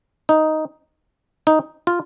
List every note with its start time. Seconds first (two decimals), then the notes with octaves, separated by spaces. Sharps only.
0.29 D#4
1.47 D#4
1.87 F4